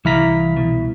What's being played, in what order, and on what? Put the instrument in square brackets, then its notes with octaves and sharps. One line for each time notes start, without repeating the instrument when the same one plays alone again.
[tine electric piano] C2 E4 B6 [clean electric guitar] E3 F5 A#5
[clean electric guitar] B2